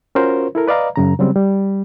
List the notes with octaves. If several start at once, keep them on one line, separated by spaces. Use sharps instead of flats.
C#4 F4 F#4 A#4 C5 C#5
E4 A4 A#4
B4 D5 D#5 F5 A#5
F#2 C#3 A#5
C#3 F#3 G3 C4
G3